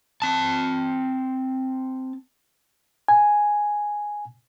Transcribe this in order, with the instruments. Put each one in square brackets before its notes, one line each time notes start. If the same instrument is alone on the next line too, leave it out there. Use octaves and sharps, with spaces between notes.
[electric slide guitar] C4 A5
[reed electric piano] G#5